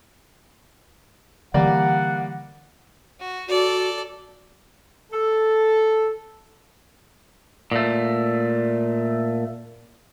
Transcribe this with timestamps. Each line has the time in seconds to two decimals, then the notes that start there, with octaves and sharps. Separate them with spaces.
1.54 D3 E3 G3 A#3 D5 F#5
3.20 F#4
3.48 F#4 A4 D5
5.12 A4
7.72 A#2 A3